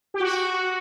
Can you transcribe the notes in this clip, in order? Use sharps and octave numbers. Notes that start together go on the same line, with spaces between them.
G4
F#4